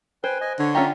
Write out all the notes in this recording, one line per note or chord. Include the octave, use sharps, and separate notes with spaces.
B4 C5 G5 G#5
D#5 G#5
D3 C#5
C#4 F4 G4 E5 A#5 C#6